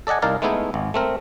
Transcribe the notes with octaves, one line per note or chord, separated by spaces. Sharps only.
A4 D5 D#5 F#5 G#5
C2 D#4 A#4 D5 F5 A5
G#3 A3 B3 D#4 E4 G#4
G#1
A3 C4 A#4